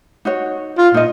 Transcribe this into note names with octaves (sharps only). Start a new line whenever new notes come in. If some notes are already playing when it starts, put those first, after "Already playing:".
D#4 F#4 C#5
F4
A#2 D#4 D#5